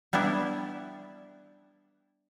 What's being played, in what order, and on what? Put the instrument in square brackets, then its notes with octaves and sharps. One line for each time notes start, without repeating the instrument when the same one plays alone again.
[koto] G3 B3 D4 E4 E5